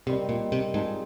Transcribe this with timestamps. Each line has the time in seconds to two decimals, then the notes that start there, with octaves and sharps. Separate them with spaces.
0.07 C3 D#3 G3 C4
0.29 A#2
0.52 C3
0.74 G#2 F3 C4 D#4 G#4